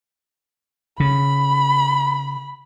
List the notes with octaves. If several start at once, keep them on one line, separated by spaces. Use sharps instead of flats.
C#3 B5